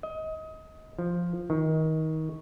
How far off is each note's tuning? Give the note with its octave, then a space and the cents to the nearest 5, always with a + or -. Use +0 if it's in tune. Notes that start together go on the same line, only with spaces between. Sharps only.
D#5 +25
F3 +0
D#3 +25